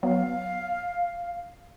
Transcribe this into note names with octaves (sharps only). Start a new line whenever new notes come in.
F#3 B3 F5